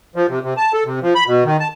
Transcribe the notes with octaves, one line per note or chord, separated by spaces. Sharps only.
F3
C3
C3
A5
A4
C3
F3
B5
B2
D#3
A5